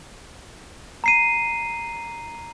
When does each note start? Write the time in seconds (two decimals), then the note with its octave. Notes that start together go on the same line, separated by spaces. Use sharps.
1.04 A#5 C7 D#7